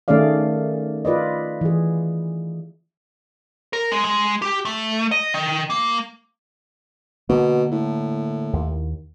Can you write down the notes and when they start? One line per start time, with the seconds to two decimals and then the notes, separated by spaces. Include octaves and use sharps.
0.08 D#3 A3 C#4 G#4 D5 F5
1.05 F4 B4 D5 D#5
1.61 E3 G#4
3.73 A#4
3.92 G#3
4.05 G#3
4.42 G4
4.65 A3
5.11 D#5
5.34 D#3
5.70 A#3
7.29 B2 D3 A#3
7.71 A2
8.53 D#2